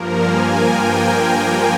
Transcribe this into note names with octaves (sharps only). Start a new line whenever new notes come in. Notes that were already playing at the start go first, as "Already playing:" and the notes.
Already playing: G2 F3 A#3 A#4
G#5
G5